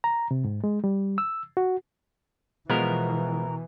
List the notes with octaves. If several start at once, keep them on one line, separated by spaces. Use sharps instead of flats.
A#5
C3
G#2
G#3
G3
E6
F#4
B2 E3 F3 G#3 B3 A#4